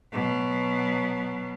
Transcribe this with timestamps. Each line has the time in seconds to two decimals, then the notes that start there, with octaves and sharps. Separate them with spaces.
0.12 B2 F#3